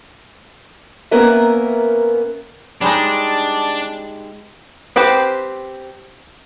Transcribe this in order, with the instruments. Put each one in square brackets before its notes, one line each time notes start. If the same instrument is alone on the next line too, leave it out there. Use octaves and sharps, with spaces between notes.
[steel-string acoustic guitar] A#3 B3 C#4 A#4 B4 E5
[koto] G3 G#3 D#4 [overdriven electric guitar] D4
[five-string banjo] C4 G4 B4 C5